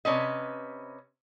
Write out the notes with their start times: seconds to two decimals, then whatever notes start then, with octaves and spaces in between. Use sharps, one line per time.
0.05 C3 C#4 B4 D#5